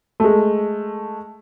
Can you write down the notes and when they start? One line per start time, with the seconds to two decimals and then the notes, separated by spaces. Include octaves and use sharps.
0.20 G#3 A3